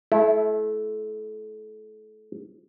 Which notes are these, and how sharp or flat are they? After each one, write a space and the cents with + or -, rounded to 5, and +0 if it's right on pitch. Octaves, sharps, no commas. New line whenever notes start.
A3 -35 E4 +0